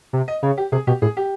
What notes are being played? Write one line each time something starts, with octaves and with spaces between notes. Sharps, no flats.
C3
D#5
C#3 C#5
G4
C3 G#4
B2 G4
A2 G#4
G4